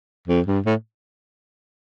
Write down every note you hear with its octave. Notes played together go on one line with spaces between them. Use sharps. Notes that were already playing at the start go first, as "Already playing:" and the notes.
F2
G2
A2